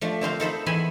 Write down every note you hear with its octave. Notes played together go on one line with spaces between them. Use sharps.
F3 A3 D4
D3 C4 C5 F5
D#4 A4 C5 B5
E2 B3 E5 G#5 B5 C6